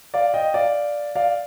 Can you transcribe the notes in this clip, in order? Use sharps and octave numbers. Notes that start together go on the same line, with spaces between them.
D5 F5
D#5 G5
D5 F5
D5 F5